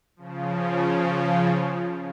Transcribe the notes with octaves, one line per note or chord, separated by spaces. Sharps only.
C#3 F3